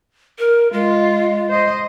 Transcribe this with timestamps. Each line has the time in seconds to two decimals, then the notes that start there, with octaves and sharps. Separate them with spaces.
0.39 A#4
0.73 G#3 F4
1.49 C5 D#5